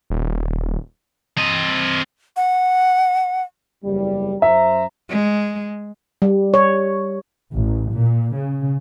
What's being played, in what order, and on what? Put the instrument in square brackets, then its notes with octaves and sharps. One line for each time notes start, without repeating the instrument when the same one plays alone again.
[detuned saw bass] D#1
[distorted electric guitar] C4 D#5
[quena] F#5
[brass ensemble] F#1 E2 G3
[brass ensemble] F#2 C5 A#5 [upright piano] E5
[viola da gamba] G#3
[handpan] G3
C#5
[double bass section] A1
A#2
C#3